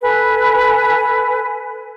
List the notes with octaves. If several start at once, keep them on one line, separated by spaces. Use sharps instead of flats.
A4 B4 G#5